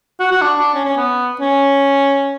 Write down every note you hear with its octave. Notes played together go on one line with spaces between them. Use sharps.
F#4
F#4
D4
D4
C#4
C#4
B3
C#4